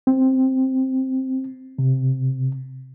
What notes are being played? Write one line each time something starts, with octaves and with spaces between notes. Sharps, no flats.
C4
C3